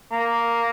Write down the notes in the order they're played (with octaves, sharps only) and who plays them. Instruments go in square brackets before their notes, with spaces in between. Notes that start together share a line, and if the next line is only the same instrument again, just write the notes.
[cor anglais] A#3